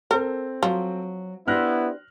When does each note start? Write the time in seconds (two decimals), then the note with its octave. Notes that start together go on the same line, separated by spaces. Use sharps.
0.11 C4 A4 A#4
0.63 F3 F#3
1.48 B3 D4 E4 G4 C5 F6 F#6 A#6